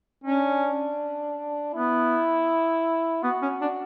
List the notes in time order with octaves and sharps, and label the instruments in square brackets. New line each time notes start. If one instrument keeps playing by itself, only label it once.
[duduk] C#4 [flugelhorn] D4
[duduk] B3 [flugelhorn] E4
[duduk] B3 [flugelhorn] F#4
[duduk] C#4
D4